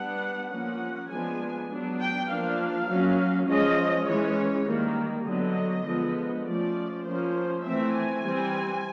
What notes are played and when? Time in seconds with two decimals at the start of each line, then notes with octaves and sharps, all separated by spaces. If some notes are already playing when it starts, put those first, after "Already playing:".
Already playing: G3 B3 D4 F#5
0.51 F3 A#3 C#4 F#5
1.09 F3 G#3 B3 D4 G#5
1.70 F#3 B3 D4
1.99 G5
2.29 F3 A#3 D4 F5
2.88 F#3 A#3 C#4
3.47 F3 G#3 C#4 D#5
4.07 E3 G#3 C#4 C#5
4.67 D#3 G3 A#3
5.26 D3 F#3 B3 D4 D#5
5.85 D3 F3 G#3 B3
6.45 F3 A3 C#4 D5
7.04 F3 A#3 C#4 C5
7.64 E3 A3 C4 E5
7.94 G#5
8.24 E3 G3 C4